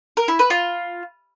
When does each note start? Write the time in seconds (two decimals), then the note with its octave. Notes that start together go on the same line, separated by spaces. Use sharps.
0.17 A#4
0.28 E4
0.39 B4
0.50 F4